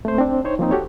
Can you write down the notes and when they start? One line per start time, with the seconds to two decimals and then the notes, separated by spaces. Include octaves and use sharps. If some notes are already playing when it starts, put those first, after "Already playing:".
0.05 A3 C4 C5
0.19 C4 D4
0.44 D#4 C5 C#5
0.59 F3 A#3 C4 D#4
0.71 F#4 G4 A4 C#5